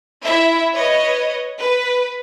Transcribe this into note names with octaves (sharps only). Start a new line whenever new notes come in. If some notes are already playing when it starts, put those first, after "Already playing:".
E4 E5
B4 C#5 D#5
B4